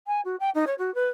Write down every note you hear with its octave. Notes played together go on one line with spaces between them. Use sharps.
G#5
F#4
G5
D#4
C#5
F#4
B4